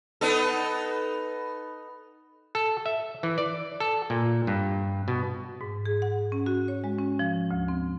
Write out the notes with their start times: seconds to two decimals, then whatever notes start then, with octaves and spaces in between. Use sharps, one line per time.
0.21 B3 D#4 A4
2.55 A4
2.86 E5
3.23 E3
3.38 D5
3.80 A4
4.10 A#2
4.47 G2
5.08 B2
5.61 G#2
5.86 G#4
6.02 F#5
6.32 C#4
6.46 F#4
6.68 C#5
6.84 G#3
6.99 C#4
7.19 F3
7.51 D2
7.68 C4